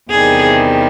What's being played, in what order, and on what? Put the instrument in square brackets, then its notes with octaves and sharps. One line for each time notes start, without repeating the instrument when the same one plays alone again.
[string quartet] E2 C3 D#3 G3 G#4